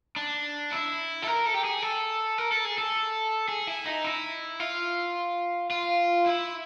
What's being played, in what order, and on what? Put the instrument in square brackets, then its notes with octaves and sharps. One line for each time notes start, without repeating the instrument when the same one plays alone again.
[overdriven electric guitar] D4
E4
A4
A#4
A4
G4
G#4
A4
A#4
A4
G#4
A4
G#4
E4
D#4
E4
F4
F4
E4